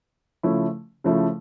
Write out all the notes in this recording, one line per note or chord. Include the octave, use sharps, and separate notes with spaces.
C#3 F3 A3 E4
C#3 F3 A3 E4